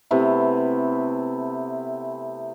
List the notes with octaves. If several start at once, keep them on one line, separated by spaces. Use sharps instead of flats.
C3 A3 B3 E4